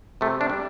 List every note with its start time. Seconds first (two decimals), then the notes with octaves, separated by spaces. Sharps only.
0.21 C3 A3
0.41 D4
0.50 G3